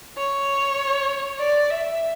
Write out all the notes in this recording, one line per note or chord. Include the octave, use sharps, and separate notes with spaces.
C#5
D5
E5